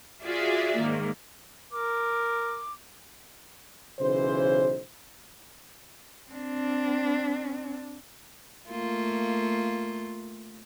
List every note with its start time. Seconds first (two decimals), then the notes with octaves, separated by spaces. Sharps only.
0.23 F4 F#4 G#4 D5 E5
0.78 G#2 D#3 A#3
1.72 A#4 D6
3.99 B1 C#3 E3 C5
6.31 C4 D4
8.70 A3 A#3 F4